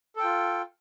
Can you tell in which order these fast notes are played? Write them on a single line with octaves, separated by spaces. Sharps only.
A4 G5 F4